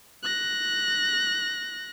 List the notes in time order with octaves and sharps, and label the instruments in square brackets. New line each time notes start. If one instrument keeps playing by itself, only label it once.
[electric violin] F#6 A#6